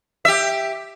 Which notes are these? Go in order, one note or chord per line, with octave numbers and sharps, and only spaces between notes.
G4 E5